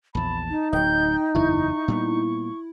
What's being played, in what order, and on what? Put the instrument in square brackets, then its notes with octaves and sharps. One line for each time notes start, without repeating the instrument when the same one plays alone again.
[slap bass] A#1 E2 [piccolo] A5 [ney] B5
[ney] D#4
[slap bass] D1 F#3 [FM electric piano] D#5 G5 [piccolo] G6
[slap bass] F#1 E2 G2 [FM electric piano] E4 [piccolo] C#6
[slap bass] A#2 G3 B3